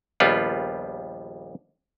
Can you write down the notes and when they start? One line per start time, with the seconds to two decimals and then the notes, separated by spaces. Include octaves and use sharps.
0.20 A#1 D#2 G3 B3 F4